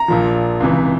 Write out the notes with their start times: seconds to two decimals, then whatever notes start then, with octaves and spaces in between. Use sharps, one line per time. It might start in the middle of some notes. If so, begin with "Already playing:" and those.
Already playing: A#5
0.08 A#1 A#2 F3
0.60 C#2 C3 E3